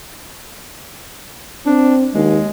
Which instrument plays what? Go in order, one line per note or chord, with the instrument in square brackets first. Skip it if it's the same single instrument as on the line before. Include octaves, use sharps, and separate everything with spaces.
[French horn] C4 [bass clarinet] D4
[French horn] D#2 [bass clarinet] G#3